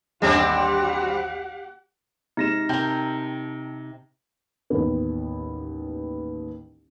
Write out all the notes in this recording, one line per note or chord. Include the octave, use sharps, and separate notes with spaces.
A1 D#2 G3 C4 D4 G4 G#4 F#5
C3 G#3 D#4 A#6 E7
C3 A#4 G5 A5 G6
A1 D#2 B3